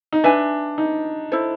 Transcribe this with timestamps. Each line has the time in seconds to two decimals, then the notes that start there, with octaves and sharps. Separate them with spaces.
0.13 D#4
0.24 D4 B4 E5 G#5
0.78 D#4
1.32 E4 A4 C5